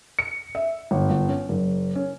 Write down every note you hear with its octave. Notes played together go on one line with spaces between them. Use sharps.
C#7
E5
G1
G1
C#4
F#1
C#4